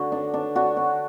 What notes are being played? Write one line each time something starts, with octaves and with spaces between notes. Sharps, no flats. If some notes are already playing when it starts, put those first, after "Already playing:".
Already playing: D3 F#4
D4
D4
D4 F#4
D4